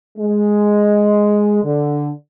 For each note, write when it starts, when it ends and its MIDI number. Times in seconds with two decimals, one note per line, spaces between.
0.19 1.62 56
1.64 2.10 50